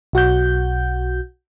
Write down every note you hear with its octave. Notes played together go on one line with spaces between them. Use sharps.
B1 F#4 F#5 G6